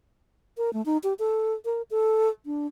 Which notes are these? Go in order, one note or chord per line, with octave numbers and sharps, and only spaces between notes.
A#4
A3
D#4
G4
A4
A#4
A4
D4